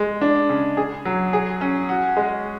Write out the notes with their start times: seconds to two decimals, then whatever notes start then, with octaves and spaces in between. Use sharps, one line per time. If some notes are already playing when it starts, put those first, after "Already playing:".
Already playing: G#3
0.21 D4
0.49 C#3
0.77 G#4
1.05 F#3
1.33 G#4
1.61 C#4
1.89 F#4
2.17 G#3